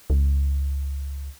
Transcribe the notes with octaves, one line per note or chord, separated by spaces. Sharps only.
C#2